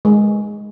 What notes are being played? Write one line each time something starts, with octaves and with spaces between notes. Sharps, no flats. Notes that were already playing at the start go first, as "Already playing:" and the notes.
G#3